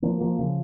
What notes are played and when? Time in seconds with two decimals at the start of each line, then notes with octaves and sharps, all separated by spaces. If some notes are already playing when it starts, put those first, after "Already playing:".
0.02 F3 A#3
0.20 F3 A#3
0.39 C#3 F3